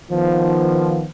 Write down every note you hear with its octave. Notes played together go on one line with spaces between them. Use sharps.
D#3 F3 B3